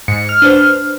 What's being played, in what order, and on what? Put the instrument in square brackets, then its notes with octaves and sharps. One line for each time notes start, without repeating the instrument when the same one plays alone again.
[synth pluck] G#2 [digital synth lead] C#7
[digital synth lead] F6
[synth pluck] D4 B4 C5